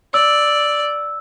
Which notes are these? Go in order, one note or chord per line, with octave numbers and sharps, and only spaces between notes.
D5 E6